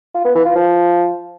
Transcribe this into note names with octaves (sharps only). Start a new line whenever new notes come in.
F4
B3
E3
F4
F3